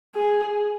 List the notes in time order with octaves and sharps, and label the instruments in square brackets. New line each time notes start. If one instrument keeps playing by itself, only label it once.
[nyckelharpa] G#4